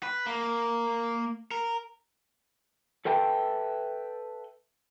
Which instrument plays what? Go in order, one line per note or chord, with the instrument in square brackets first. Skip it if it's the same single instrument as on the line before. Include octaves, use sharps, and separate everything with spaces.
[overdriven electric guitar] B4
A#3
A#4
[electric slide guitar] A4 B4 E5 G5 A5